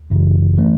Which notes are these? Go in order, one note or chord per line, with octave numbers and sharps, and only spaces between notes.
G#1 F#2 C#3 E3
E3 A3 C#4